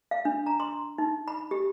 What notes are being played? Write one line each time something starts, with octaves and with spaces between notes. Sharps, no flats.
F5
D4
A#5
C6
D#4
B5
G4